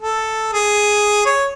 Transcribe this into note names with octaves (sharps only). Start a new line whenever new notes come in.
A4
G#4
C#5